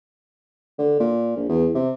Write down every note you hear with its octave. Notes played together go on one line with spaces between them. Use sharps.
D3
A#2
A#1
E2
C3